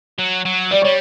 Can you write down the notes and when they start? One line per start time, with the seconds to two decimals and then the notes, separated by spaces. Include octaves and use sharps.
0.18 F#3
0.45 F#3
0.71 G3 D5
0.82 G3 C#5